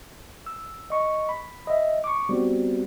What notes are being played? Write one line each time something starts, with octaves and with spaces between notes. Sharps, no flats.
E6
D#5 C#6
B5
D#5 E5
C#6 D6
G3 B3 C4 F#4